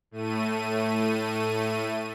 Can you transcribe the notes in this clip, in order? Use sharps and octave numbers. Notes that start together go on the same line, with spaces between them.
A2 A3 D#7